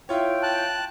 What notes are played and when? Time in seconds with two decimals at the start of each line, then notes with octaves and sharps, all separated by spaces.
0.09 E4 F4 C#5 G5
0.43 A5 F#6